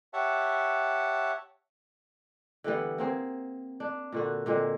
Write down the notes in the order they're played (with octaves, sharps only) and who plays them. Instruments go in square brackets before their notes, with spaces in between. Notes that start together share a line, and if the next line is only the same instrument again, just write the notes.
[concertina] G4 C#5 E5 F#5 A5
[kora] D3 E3 G3 B3
A#3 C4 G#4
D4
A#2 D3 F#4
A#2 D3 G#3 C4